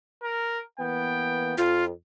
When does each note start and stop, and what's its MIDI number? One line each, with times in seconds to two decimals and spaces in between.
0.23 0.60 70
0.79 1.55 52
0.79 1.55 58
0.79 1.55 59
0.79 1.60 79
1.58 1.90 41
1.58 1.84 65